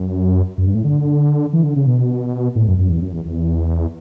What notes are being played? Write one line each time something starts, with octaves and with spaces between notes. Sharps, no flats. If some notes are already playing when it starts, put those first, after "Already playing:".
Already playing: F#2
F#2
G2
A2
D3
E3
D3
C#3
B2
A2
F#2
F#2
E2
F#2
E2
E2